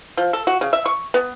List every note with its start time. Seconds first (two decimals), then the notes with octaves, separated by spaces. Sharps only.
0.17 F3
0.33 A4
0.47 F#4
0.61 C#3
0.73 E5
0.86 C#6
1.14 B3